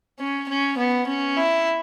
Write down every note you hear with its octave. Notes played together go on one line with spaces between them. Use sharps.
C#4
C#4
B3
C#4
E4